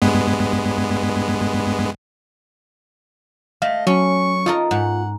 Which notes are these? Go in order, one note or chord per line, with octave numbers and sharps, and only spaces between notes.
G2 G#3 B3
A3 D#5 F5
F#3 C#4 C#6
D#4 F4 A4 A#4
G#2 F#5